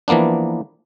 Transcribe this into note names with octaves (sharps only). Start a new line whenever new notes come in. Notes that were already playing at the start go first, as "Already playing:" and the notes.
E3 F3 A#3 B3 D4